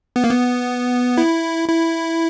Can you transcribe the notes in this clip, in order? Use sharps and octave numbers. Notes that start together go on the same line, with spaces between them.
B3
A#3
B3
E4
E4